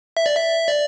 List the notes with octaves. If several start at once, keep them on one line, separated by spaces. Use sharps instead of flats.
E5
D5
E5
D5